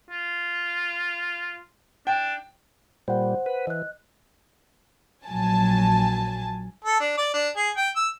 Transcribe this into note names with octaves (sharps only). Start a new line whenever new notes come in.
F4
D4 G5
A#2 G3 C5 F#5
B4
E3 D#5 F#6
A#1 F#3 G#5 A5
A4
D4
D5
D4
G#4
G5
E6